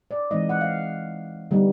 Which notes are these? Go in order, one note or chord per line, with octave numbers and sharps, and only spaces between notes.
D5
E3 G#3 C4 D#4 D#5
F#5
F5
D3 G3 B3 D#4